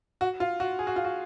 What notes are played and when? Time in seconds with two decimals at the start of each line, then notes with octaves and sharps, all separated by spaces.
0.21 F#4
0.40 F4
0.60 F#4
0.79 G#4
0.87 F#4
0.96 F4
1.05 F#4